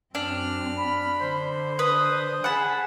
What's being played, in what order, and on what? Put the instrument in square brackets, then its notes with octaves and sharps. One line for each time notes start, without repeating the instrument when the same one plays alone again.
[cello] F#2 C4 [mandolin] D4 [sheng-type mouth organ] F6
[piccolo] B5
[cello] D3 [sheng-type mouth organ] C5
[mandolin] B4 [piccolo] D#6
[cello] G#4 [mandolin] F#5 A5 [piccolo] B5